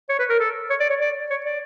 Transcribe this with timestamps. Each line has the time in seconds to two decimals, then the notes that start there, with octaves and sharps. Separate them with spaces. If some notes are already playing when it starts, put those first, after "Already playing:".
0.09 C#5
0.19 B4
0.29 A#4
0.39 A4
0.70 C#5
0.80 D5
0.90 C#5
1.01 D5
1.30 C#5
1.45 D5